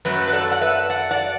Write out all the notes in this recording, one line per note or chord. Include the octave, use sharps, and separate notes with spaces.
F#2 F#3 A3 F#4 B4
B4
A4 D5
F#5
B4 E5
D5 F#5
D5 F#5